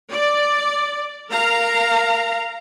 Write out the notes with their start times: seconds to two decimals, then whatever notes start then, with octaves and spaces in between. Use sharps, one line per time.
0.11 D5
1.30 A#4 F5 A#5